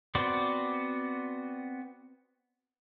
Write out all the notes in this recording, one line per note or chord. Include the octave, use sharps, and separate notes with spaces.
B3 C4 F#4 C5 D5